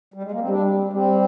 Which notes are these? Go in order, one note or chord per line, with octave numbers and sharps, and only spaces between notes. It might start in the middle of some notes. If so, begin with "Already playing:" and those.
G3
G#3
A#3
C4
G3 D4
G3 C4